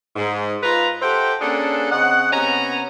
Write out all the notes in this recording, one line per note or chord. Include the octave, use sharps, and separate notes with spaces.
G#2
F4 B4 A#5
G4 A4 C5 E5 F#5 G5
A#3 C#4 D4 G#4 A4 F#5
C#3 C4 D#5 F#5
C3 B3 C#4 G#5 A#5